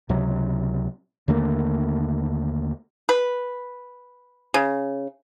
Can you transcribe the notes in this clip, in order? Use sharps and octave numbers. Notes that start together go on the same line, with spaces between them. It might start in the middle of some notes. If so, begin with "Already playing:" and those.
C#2 C3 F#3
D#2 D3 A3 A#3
B4
C#3